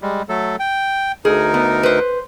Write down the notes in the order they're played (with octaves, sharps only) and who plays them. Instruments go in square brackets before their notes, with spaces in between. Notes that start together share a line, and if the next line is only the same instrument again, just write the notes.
[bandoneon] G3 G#3
F#3 A3 A4
G5
[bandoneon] D2 D#4 A#4 [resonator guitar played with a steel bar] G#4
[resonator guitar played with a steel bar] B3
B4 C5